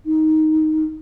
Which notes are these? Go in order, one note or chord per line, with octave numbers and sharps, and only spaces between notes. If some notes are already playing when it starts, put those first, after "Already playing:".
D#4